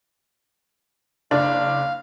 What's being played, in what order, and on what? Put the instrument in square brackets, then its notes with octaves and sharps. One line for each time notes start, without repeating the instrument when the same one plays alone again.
[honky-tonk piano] F#1 D4 [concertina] F5